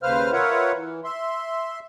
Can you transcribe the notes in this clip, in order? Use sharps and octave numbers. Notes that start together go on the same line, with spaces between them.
D#2 C#3 B4 C5 F5 F6
F4 A#4 B4 C#5 E5 F#5
E3
E5 C6